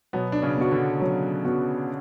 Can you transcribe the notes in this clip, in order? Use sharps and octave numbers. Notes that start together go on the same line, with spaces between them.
B2 F#3 B3
D4
C#3 C#4
B3 F#4
D3 D4
F#3
B3 F#4